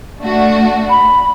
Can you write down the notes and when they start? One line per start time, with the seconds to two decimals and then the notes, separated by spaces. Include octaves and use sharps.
0.20 A3 D4 F#4
0.90 B5